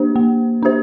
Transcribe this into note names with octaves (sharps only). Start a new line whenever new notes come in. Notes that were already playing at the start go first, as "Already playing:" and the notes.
Already playing: A#3 D4 G4 C5
A#3
D4 G4 C5